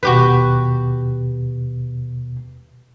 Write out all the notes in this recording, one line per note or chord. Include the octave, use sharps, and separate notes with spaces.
D#2 B2 F#4 G4 B4